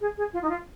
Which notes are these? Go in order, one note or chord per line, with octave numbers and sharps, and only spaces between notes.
G#4
G#4
F4
D#4
F4